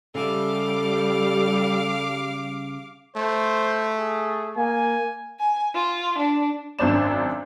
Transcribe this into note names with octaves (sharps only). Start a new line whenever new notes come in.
C#3 G3 G#4 A4 E5 F5 D6
A3 C5
G#4
A#3 G#5
G#5
F4
D4
G#1 F#2 D4 C5 D5 E7